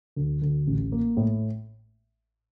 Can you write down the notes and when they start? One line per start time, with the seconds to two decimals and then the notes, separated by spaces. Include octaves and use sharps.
0.16 D2
0.42 D2
0.67 A1
0.92 A#3
1.17 A2